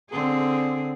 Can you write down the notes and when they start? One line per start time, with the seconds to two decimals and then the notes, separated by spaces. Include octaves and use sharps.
0.10 D3 C4 G#4